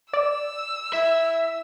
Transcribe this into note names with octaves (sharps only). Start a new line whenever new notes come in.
D5 E6
E4 E5